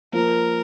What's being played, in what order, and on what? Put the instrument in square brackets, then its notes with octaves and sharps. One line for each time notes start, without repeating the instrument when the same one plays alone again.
[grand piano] F3 A#3 [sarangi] A#4